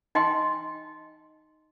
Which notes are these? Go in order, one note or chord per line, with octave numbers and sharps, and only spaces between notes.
D#4 D#5 G5 G#5 C6